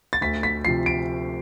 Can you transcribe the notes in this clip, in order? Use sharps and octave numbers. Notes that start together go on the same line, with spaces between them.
A6
D2 B6
B6
C3 F3 C7
D7